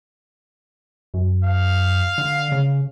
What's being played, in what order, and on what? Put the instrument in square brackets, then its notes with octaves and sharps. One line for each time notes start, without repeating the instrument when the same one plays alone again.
[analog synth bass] F#2
[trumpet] F5
[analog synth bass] D3
C#3